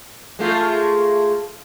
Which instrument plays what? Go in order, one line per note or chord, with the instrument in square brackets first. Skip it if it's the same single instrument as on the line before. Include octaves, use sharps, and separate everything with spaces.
[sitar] G#3 A3 F4